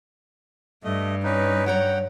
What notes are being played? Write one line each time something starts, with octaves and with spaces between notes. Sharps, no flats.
G2 A3 D#5
C#4 D#4 B4
F#3 C#5 F#5 G5 A#5